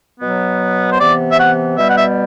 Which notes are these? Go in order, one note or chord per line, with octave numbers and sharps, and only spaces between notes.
B2 F#3 B3
C5
C3 E3 B3 D5
E5
F#5
B2 G3 B3 E5
F#5
E5